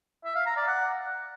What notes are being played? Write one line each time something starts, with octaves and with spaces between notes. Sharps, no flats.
E5
F5
A#5
D5
F#5